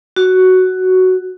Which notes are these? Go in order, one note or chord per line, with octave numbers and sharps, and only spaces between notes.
F#4